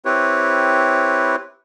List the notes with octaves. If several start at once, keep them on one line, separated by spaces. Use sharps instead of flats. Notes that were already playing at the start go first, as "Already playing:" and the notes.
C4 E4 G4 B4 C#5